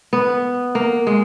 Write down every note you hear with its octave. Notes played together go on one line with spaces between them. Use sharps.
B3
A#3
G#3